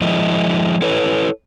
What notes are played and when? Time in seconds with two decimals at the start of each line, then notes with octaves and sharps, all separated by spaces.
0.01 F3 G#3 E4 D#5
0.82 E4 A4 B4 C#5